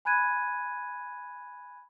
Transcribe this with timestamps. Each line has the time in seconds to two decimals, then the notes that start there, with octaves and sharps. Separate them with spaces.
0.05 G#5 B5 F#6 G#6 D#7